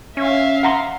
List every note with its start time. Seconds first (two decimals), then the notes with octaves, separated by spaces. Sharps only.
0.17 C#4 E5 F5
0.63 F#5 A#5 C6